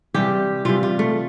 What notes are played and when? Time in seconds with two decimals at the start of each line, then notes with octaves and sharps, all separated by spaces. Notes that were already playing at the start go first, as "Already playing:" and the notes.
0.14 C3 E3 G3 G4
0.65 C3 E3 G3 F4
0.83 F4
0.99 A3